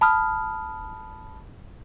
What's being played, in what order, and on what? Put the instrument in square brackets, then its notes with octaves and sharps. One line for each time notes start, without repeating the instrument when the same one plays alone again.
[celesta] A5 B5 D#6 F6